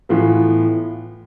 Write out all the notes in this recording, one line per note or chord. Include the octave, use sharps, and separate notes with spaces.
A2 E3 B3 F4